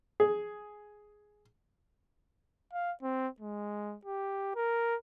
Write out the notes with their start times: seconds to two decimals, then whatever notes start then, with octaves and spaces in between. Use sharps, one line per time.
0.20 G#4
2.73 F5
3.03 C4
3.40 G#3
4.05 G4
4.56 A#4